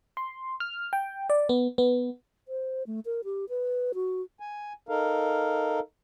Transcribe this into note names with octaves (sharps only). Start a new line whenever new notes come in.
C6
F6
G5
D5
B3
B3
C5
A3
A#4
G4
B4
F#4
G#5
D#4 A4 A#4 F5